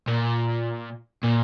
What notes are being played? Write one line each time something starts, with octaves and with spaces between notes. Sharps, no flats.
A#2
A#2